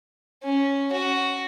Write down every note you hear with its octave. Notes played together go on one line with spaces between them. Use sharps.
C#4
F#4